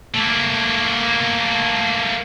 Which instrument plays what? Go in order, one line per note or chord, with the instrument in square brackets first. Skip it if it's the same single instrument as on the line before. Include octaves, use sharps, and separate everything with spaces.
[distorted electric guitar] A3 A#3